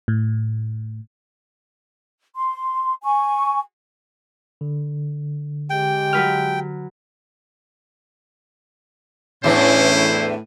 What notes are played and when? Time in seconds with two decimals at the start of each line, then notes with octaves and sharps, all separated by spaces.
0.08 A2
2.35 C6
3.03 G#5 C#6
4.61 D3
5.70 G#3 G4 G5
6.13 F#3 B4 F6
9.44 E2 A2 E3 C#4 D4 E4 C5